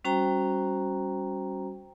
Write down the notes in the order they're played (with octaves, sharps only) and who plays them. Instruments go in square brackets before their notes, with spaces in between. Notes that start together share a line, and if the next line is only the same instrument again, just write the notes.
[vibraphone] G3 C#4 F#4 C5 G5 A#5